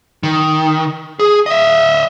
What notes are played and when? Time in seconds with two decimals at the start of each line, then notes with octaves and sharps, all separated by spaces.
0.23 D#3
1.19 G#4
1.46 D#5 E5